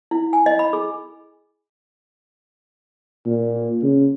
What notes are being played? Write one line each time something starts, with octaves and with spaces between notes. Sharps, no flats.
E4
G#5
D#5
B5
G#4
A#2
C#3